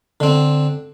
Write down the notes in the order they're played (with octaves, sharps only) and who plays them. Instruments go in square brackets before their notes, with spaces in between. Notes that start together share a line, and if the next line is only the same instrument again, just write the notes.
[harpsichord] D3 C4